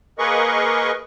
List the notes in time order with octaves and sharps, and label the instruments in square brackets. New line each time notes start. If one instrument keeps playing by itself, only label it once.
[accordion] A#3 G#4 A#4 B4 D#5 C#6